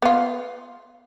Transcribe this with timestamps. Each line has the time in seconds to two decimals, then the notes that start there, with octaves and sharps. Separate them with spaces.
0.02 B3 F4